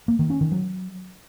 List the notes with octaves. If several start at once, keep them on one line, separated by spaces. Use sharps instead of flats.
A#3
D#3
C#4
D#3
F#3